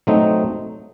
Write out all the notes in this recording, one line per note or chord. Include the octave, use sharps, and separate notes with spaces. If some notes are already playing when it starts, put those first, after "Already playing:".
F#3 A3 C4 D#4